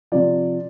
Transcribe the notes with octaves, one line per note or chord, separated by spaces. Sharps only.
C3 F3 D5